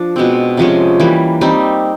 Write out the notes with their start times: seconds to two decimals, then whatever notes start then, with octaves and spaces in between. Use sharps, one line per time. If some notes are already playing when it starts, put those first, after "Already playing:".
Already playing: F3 D4
0.16 B2 G#3 C4
0.57 C3 F3 G#3 C#4
1.00 E3 G3 A#3
1.41 G3 C4 D#4